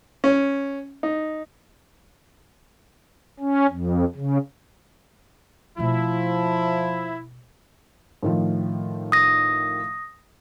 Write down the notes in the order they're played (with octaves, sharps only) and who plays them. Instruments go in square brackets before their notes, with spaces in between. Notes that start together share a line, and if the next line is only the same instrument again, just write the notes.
[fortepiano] C#4
D#4
[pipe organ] C#4
F2
C#3
[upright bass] B2 A3 [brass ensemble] F3 [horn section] E4
[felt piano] A2 D#3 F3
[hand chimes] D#6 A#6